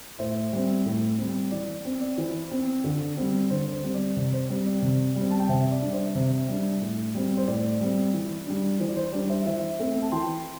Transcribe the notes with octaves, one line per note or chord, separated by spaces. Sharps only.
A2 C5 E5
G3 C4
A2
G3 C4
E3 D5
C4
D5
E3 C5
C4
D3
G3 C4
D3 C5
C5
G3 C4
D5
C3
C5
G3 C4
D5
C3
G3 C4
A5
G5
C3 C5 E5
D5
G3 D4
C5 E5
C3 C5 E5
G3 D4
A2
G3 C4
C5
A2 D5
G3 C4
E3
G3 D4
E3 C5
D5
C5
G3 D4 D5
C5 E5
E3 C5 E5
A3 C4
A5
E3 G5 C6